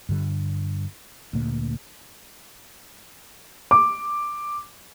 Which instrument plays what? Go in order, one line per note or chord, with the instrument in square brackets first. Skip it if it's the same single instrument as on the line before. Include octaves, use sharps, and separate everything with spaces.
[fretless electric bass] G2 D3 G3
D2 A#2 A#3
[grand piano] D6